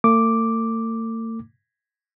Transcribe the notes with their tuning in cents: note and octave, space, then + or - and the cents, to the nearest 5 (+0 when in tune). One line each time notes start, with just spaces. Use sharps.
A3 +45 D6 +0